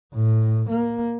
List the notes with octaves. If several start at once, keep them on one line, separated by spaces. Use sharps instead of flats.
A2
A#3